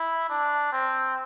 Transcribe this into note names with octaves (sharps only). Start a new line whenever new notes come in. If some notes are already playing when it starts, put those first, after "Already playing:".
Already playing: E4
D4
C4